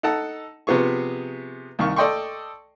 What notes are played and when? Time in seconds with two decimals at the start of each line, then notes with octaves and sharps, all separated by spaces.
0.03 D#4 A4 F#5 A5
0.67 C3 F3 B3 G#4 C#6
1.79 C2 D#3 F5 C#6
1.96 A4 D5 D#5 G5 C6 C#6